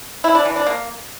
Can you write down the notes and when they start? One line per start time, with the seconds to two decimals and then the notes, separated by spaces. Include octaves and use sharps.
0.24 E4
0.35 D4
0.45 E3
0.56 D4
0.67 A#3